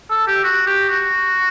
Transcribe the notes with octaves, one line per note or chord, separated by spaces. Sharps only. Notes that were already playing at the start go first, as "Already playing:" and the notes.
A4
G4
F#4
G4
F#4